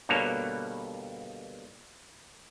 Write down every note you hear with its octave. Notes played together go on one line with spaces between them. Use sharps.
G2 B2 D3 A#3 C#5